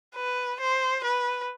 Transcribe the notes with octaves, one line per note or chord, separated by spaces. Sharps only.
B4
C5
B4